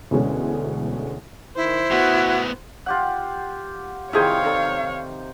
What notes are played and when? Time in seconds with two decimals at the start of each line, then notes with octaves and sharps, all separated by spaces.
0.11 D2 B2 E3 G#3 A3 C#4
1.56 D#3 E4 C5
1.91 A2 B3 F#4
2.86 F4 G4 F#5
4.13 C3 D#3 E4 F4 G#4 C5 C#5 F5
4.44 D#4 A4 D5